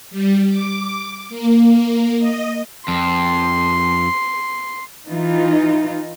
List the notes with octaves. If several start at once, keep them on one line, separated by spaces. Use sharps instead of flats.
G3
D6
A#3
D#5
F2 C6
E3 D#4 F4